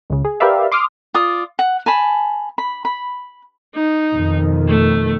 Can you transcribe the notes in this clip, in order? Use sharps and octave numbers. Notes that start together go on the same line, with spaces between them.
C#2 C#3
G#4
G4 A#4 B4 D5 E5 F5
C6 D6 D#6 F6
F4 D5 D#6
F#5
G#5 A5 B5
B5
B5
D#4
F2 B2 D#3
A3